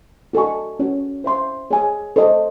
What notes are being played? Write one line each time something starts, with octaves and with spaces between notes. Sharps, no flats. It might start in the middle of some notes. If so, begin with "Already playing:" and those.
F#4 A4 D#5 G#5 C#6
C#4 F#4 C#5
C5 E5 C6
G#4 C#5 G#5
A4 C5 D#5